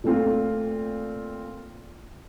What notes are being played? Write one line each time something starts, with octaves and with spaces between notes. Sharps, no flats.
A#2 A3 C4 F4